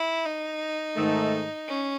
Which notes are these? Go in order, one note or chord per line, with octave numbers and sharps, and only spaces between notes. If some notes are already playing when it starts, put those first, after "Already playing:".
Already playing: E4
D#4
G#2 D#3 A3
C#4